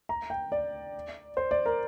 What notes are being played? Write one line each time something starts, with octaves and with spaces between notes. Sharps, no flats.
A#5
G5
D5
C5
D5
A#4